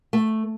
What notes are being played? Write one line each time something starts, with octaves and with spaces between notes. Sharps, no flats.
A3